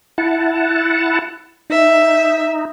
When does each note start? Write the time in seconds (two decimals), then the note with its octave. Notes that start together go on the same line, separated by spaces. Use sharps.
0.18 E4 F#5 A5
1.70 D#4 E5